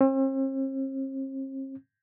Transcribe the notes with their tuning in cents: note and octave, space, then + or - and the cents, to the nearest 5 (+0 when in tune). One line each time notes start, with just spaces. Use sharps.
C4 +45